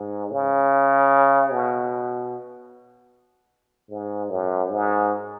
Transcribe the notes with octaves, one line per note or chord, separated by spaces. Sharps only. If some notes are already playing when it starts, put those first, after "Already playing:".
Already playing: G#2
C#3
B2
G#2
F#2
G#2